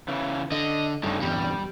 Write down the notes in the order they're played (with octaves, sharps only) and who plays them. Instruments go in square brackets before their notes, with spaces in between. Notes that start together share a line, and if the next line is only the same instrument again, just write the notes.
[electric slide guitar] C#3 E3
[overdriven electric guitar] D3 [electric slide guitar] D#5
[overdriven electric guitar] G2 [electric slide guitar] C#3 A3 D#4
[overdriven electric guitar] E2 G2 [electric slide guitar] G3